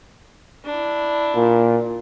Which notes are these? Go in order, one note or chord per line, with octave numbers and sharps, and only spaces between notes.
D4 E4
A#2